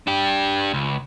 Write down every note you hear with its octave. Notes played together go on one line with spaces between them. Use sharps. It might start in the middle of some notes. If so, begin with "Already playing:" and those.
D4 G4
C#2